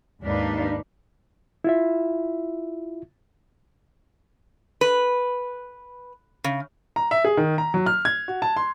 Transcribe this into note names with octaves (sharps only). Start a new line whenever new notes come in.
D#2 G#2 D4 D#4 B4 F5
E4 F4 E5
B4
C#3
A#5
E5
G#4
D#3
A#5
F#3
F6
G#6
F#4
A5
C6